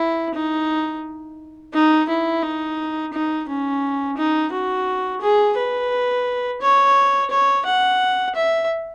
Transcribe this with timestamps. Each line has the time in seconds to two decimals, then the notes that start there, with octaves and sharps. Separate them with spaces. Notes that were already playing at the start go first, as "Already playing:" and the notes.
Already playing: E4
0.34 D#4
1.73 D#4
2.09 E4
2.43 D#4
3.13 D#4
3.48 C#4
4.17 D#4
4.52 F#4
5.21 G#4
5.57 B4
6.61 C#5
7.30 C#5
7.66 F#5
8.35 E5